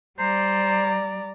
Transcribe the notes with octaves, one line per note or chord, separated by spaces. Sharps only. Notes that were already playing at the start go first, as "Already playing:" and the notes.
G3 C5 D5 A#5